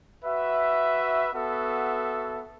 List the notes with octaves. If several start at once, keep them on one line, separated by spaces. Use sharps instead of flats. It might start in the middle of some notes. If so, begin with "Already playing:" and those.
F#4 B4 E5
B3 F#4 A4 E5